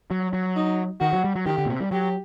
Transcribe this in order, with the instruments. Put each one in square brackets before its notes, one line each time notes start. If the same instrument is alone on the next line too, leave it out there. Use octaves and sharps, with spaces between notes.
[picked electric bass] F#3
F#3
[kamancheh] D#4
[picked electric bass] D#3 [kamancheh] F#4
[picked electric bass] F#3
G3
F#3
[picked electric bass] D#3 [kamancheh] G4
[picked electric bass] D3
A#2
C3
G3
[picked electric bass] F#3 [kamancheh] G4